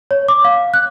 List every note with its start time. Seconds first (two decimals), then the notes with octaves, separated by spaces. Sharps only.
0.11 C#5
0.28 D6
0.45 F5
0.74 F#6